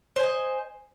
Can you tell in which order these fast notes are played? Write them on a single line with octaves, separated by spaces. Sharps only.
C5 G#5 D#5